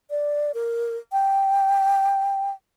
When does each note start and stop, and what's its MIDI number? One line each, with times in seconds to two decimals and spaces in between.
0.10 0.52 74
0.54 0.97 70
1.12 2.50 79